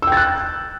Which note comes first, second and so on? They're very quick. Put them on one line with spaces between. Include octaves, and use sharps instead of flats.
E6 G5 A6 F#6